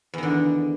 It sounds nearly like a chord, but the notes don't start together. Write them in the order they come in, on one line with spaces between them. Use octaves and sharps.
E2 D#3 D3